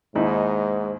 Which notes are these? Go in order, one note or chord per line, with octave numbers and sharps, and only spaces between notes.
D#2 G#2 D#4 E4